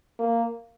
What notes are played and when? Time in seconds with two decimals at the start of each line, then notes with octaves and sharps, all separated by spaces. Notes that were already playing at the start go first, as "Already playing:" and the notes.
0.19 A#3